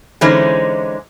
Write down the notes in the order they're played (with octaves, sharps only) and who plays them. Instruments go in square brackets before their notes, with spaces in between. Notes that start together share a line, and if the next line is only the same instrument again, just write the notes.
[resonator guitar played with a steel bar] D3 E3 G#3 C#4 D#4 C5